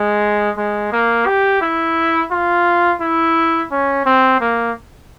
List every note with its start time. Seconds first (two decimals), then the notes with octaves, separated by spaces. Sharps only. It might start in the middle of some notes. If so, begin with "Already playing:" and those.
Already playing: G#3
0.57 G#3
0.92 A#3
1.26 G4
1.61 E4
2.31 F4
3.01 E4
3.71 C#4
4.06 C4
4.41 A#3